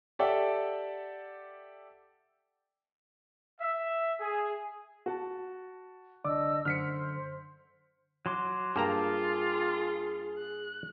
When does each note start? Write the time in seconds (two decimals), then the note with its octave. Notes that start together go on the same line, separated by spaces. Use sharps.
0.19 G4 A4 D5 E5 F#5 G5
3.61 E5
4.21 G#4
5.06 F#4 A5
6.24 C2 D3 D4 D5 D#5 D6 E6
6.65 F#2 D3 C5 F6 B6 C#7
8.26 F#3 C6 D6
8.76 G2 A#3 F4 G#4 G5 A5 A#5 D6
10.38 F#6